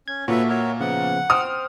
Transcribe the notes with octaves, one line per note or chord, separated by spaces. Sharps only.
C#4 G#6
A#2 F#4 A4 B4 C#5 E5
F#4 A#4 C#5 E5
C#3 F3 B3 F#5
C5 G5 D#6 F6